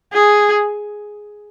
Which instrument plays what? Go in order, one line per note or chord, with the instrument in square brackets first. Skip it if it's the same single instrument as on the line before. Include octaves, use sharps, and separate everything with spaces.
[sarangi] G#4